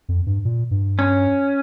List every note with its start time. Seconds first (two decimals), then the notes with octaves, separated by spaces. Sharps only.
0.09 F2
0.26 G2
0.45 A#2
0.71 G2
0.99 C#4